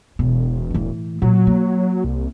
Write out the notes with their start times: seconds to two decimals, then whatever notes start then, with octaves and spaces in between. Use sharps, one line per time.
0.19 E1 B2
0.71 A2 E3
1.22 A#2 F#3
1.47 A#3
2.04 C2